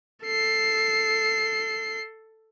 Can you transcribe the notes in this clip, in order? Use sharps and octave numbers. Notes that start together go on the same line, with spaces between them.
A4 C7